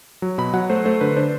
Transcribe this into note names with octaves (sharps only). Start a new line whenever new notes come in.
F#3
B2 B5
F#3 F#5
A3 C5
A3 C5
D3 B4
D4 C5